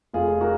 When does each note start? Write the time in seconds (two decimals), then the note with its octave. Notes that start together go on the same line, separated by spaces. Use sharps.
0.14 F1 F4 G#4
0.41 F#4 A#4